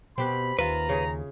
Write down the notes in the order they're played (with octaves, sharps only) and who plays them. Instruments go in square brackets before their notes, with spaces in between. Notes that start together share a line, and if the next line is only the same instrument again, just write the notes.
[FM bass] B2 [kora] C4 G4 B4 [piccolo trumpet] B5
[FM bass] D#2 [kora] F4 E5 [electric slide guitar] B4 [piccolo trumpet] A#5
[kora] C#3 G#4